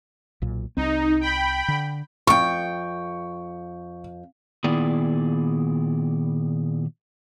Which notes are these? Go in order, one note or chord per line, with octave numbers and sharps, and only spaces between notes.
B1 A#2
C2 C4 D#4
G5 B5
D3
F2 G5 C#6
A#2 D#3 B3 E4 G#4 D5